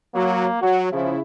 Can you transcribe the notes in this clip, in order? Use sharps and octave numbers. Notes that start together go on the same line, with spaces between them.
F#3 A#3
F#3 F#4
C#3 F3 E4